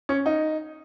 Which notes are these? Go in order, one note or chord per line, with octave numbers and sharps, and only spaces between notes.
C#4
D#4